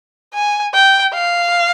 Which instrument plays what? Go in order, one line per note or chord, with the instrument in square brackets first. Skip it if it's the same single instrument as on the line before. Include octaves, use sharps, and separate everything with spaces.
[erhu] G#5
G5
F5